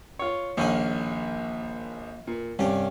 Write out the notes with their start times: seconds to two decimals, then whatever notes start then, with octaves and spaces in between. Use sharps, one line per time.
0.19 F4 C#5
0.57 A#1 D#2 A#3 C#4 G#4
2.27 A#2
2.59 C2 G2 C#4 G4